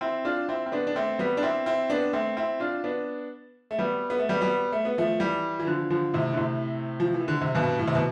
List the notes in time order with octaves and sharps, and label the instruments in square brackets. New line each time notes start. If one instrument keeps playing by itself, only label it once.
[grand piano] C4 E4
D4 F4
C4 E4
C4
B3 D4
D4
A3 C4
G3 B3
D4
C4 E4
C4 E4
B3 D4
A3 C4
C4 E4
D4 F4
B3 D4
A3
G3 B3
B3
A3
G3 B3
G3 B3
A3
B3
F3 A3
E3 G3
E3
D3 F3
D3 F3
A2 C3
D3
A2 C3
F3
E3
D3
C3
G2 B2
A2
C3
B2